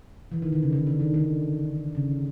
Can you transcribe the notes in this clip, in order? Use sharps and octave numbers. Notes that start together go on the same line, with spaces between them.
E3
D#3
D3
C#3
D3
D3
D#3
D3
C#3